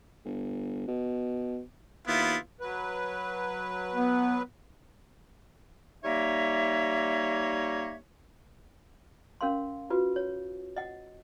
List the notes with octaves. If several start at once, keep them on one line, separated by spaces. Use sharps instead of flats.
G1
B2
D#2 B3 E4 F4
F#3 B4
B3
G3 A#3 D#4 C#5 E5
C#4 A#4 F5 C6
F4 F#4 B4
C#5
D#5 F#5